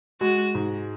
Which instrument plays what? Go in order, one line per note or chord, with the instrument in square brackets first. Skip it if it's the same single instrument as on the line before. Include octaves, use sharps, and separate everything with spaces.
[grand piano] G#3 [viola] F#4
[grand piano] G#2